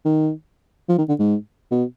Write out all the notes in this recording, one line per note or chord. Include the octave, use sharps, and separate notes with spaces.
D#3
F3
D#3
D3
G#2
B2